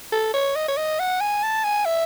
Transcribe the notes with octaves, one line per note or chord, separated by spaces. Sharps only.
A4
C#5
D#5
C#5
D#5
F#5
G#5
A5
G#5
E5